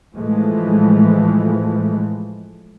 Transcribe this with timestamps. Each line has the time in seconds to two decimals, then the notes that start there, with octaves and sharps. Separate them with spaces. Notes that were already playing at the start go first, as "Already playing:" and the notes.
0.16 A2 E3 F3 G#3 A3